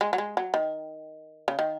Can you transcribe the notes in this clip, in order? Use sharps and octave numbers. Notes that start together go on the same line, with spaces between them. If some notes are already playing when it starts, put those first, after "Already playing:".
G#3
F#3
G#3
F#3
D#3
C#3
D#3